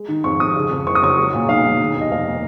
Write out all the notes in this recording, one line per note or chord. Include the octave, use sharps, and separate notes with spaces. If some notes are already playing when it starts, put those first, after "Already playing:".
Already playing: G#3
D#3
F2 C#6
F2 D#6
C#3
F2
F#1 C#6
D#6
F#3 C#6
G#3
A#2
B1 F5
B1
D#3
D#2
D#5
F1 F5
A#3